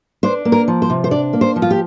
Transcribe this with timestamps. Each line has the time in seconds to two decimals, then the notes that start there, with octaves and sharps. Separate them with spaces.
0.23 D4 C5
0.45 A#3
0.52 A#4
0.68 F3
0.82 C5
0.90 C3
1.04 C5
1.11 D4 D5
1.33 A#3
1.41 C5
1.56 F3
1.62 F4
1.71 G4